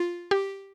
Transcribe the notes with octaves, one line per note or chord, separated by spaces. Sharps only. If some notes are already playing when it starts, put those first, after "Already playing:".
Already playing: F4
G4